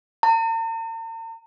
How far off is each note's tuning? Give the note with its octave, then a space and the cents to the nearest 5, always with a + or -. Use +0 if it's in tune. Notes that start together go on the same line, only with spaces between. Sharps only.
A#5 -45